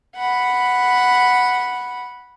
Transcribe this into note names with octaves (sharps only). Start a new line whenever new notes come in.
F#5 B5